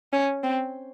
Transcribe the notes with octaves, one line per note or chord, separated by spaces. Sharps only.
C#4
C4